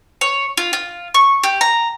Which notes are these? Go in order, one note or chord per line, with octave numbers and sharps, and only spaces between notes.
C#5
F4
F4
C#6
G4
A#5